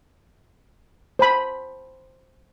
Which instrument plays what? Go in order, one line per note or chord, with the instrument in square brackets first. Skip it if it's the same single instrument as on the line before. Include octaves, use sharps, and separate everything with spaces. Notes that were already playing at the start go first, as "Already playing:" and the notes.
[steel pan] C5 A5 B5